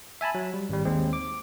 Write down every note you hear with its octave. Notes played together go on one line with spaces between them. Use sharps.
E5 G#5 A5 B5
F#3
G3
G#1 G3
D#2 G#3 C4
D6